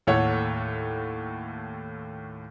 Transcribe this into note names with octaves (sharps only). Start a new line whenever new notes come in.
D#2 A2 A4 C#5 F#5